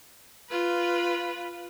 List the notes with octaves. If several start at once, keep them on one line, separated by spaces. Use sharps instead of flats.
F4 B4